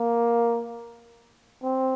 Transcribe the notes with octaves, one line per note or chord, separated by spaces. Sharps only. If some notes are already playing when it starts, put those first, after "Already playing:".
Already playing: A#3
C4